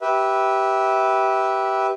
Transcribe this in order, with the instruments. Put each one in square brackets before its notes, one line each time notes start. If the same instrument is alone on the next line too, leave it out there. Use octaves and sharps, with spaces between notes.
[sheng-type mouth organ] G4 B4 E5